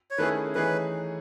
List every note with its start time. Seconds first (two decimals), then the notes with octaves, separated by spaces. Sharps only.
0.11 C#5
0.18 D#3 A3 C#4 E4 G#4 B4
0.55 E3 A3 D#4 G#4 B4 C#5